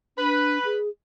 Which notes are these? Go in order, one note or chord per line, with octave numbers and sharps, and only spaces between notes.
D4 B4
G#4